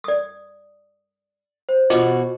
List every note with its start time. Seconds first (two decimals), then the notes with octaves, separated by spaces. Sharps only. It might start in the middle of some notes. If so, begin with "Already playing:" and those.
0.04 D5 D#6
1.69 C5
1.90 B2 E3 F4 F#4 D#5